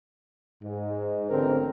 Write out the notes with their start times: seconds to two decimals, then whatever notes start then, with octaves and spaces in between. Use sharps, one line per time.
0.63 G#2
1.29 A1 D3 C4 A#4